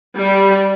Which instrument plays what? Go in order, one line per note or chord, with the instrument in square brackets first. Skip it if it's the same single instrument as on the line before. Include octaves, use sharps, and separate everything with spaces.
[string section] G3